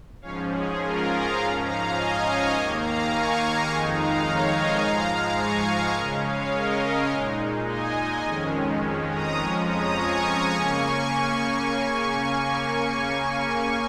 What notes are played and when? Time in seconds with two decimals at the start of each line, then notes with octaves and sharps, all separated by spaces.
0.22 G#2 F3 C#4 C#5 F5
0.51 G#4
0.80 F4 A#4
1.08 F5 A#5
1.37 G#2 F3 C#4 F5 A#5
1.65 F5 A#5
1.94 D#5 G#5
2.22 C#5 F5
2.52 D#2 D#3 A#3 D#5 G#5
2.80 F5 A#5
3.09 G#5 C#6
3.66 F2 D#3 G#3 D#4 G#5 C#6
3.95 F5 A#5
4.23 C#5 F5
4.52 D#5 G#5
4.81 G#2 F3 G#3 F5 A#5
5.38 G#5 C#6
5.95 C#3 G#3 C#4 A#4 D#5
6.24 C#5 F5
6.53 A#4 D#5
7.10 A#2 G#3 D#4
7.67 D#5 G#5
8.25 F2 D#3 G#3 C#4
9.10 A#5 D#6
9.39 F2 F3 G#3 C#4 G#5 C#6
9.68 A#5 D#6
9.97 G#5 C#6
10.25 G#5 C#6
10.54 C#3 A#3 C#4